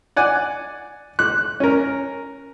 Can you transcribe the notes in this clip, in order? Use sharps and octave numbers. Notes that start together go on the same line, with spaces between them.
D5 F#5 G#5
F#6
C#4 A#4